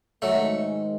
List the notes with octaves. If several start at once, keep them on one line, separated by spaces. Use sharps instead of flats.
G#2 D#3 F#3 G#3 A3